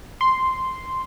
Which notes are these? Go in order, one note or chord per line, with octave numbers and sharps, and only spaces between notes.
C6